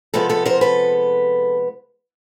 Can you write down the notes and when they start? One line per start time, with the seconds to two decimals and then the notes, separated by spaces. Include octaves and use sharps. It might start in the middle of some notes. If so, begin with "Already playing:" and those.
0.14 C3 F3 G#3 B3 A4 B4
0.29 A4 B4
0.45 A#4 C5
0.61 A4 B4